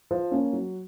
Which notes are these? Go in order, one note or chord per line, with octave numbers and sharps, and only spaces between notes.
F3
A#3 C#4
F#3